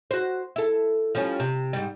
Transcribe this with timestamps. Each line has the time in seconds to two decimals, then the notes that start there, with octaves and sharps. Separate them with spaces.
0.11 F#4 C5
0.56 E4 A4
1.15 F3 G3 C#4
1.40 C3
1.73 G#2 G3